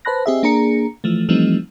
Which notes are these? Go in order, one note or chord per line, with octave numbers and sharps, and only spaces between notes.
B4 C5 A5 B5 F#6 A#6
C4 G4 G#4 D#5 E5
A#3 D4 G#4 A#5 C#7
E3 F3 A3
E3 F3 G3 A3 C4 D#4